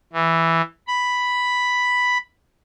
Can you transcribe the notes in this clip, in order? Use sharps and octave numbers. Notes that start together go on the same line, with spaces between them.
E3
B5